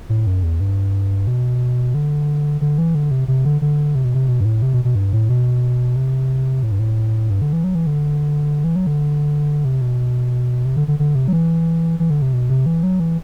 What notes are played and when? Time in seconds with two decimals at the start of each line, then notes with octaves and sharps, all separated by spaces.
0.09 A2
0.27 F#2
0.43 E2
0.60 G2
1.27 B2
1.94 D3
2.61 D3
2.78 E3
2.95 D3
3.11 C3
3.28 C3
3.45 D3
3.62 D3
3.95 C3
4.05 B2
4.14 C3
4.28 B2
4.40 G2
4.45 A2
4.62 C3
4.73 B2
4.85 B2
4.95 G2
5.13 A2
5.29 B2
5.96 C3
6.63 A2
6.72 G2
6.79 A2
7.30 G2
7.42 D3
7.53 E3
7.64 F#3
7.75 E3
7.87 D3
8.64 E3
8.76 F#3
8.87 D3
9.65 C3
9.81 B2
10.65 C3
10.77 D3
10.88 D3
10.99 D3
11.15 C3
11.28 F#3
11.33 E3
12.00 E3
12.10 D3
12.22 C3
12.33 B2
12.50 C3
12.66 E3
12.83 F#3
13.00 E3